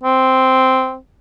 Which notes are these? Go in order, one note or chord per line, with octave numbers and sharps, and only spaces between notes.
C4